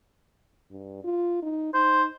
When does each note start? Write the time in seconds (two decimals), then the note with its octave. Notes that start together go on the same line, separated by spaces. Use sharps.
0.71 G2
1.04 F4
1.42 D#4
1.74 D#4 C5